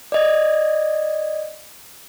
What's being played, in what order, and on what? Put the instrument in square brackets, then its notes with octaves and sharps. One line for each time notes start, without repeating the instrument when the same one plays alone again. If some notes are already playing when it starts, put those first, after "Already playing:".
[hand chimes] D5 D#5 G#6